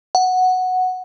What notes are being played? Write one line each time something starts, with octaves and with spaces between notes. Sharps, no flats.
F#5